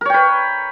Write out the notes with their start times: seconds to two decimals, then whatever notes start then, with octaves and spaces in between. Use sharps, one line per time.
0.01 A#4
0.05 C#5
0.10 G5
0.14 B4